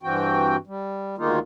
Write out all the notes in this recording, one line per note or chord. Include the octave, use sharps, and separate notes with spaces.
G2 E3 C4 F#4 G5
G3
D2 D#3 G#3 A#3 D#4 F4